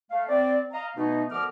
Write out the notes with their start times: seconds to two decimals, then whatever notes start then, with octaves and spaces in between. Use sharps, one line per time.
0.11 A3 F5
0.29 C4 D5
0.73 D#5 F5 A#5
0.96 B2 A3 B3 D#4
1.31 D2 F3 B3 A#4 D6 F6